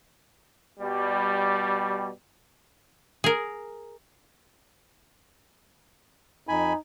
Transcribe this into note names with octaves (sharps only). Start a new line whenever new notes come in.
B2 G3
G#4 A#4
F2 D#4 G#5 B5